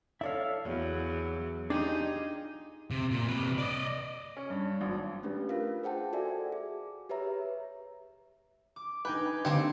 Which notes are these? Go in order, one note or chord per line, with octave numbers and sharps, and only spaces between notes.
E4 A4 C#5 D5 E5 F5
E2 F#3
D4 D#4 F4 G4 G#4
C3
A#2
C3 B4
D5 D#5
C#4
G2
G#1
A3 C#4 D4 G4 B4
F4 A#4 F5
G#4 C5 F#5 G5 A5
F#4 A4 D5 E5 G#5
G#4
G4 B4 C#5 E5 A#5
D6
D#4 B4 G5 G#5
D3 A#3 C4 G4 C#7